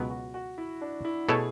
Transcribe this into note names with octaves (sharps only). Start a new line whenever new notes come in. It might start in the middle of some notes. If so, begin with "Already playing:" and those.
Already playing: C#2 B2 F#3 B3
F#4
F#4
E4
D4
E4
B2 A3 E4 G#4 A4 C#5